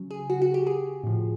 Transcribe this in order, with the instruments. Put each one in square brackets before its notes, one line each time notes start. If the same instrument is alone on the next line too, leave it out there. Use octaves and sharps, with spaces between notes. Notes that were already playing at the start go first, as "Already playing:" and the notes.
Already playing: [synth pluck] C#3 F#3
G#4
F#4
F#4
G4
G#4
A2 F3